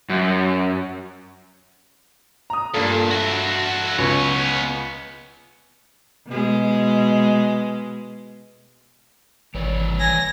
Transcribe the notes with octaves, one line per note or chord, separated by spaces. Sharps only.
F#2
A#5 D#6
G2 A#2 A4
F#4 E5
C#2 B3 C#5
B2 G#3
G#1 E3 C#5 D5
G#5 A#6